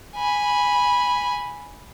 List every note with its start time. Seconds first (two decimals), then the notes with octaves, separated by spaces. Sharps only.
0.16 G#5 B5